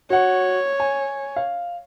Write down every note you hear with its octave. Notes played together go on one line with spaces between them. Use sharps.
F#4 C#5 F#5
G#5
F5